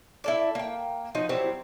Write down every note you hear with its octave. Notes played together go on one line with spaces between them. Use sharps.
E4 A4 D5
A#3 G5
F3 D#4 F#4
F#3 G3 C4 E4